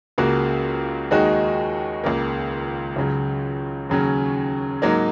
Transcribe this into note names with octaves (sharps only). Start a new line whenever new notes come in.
C#2 C#3 A#3 F#4
D#2 D#3 G#3 D#4 F#4
C#2 C#3 A#3
C#2 C#3 F#3
D#2 C#3 F#3 C#4
G#2 F#3 A#3 D#4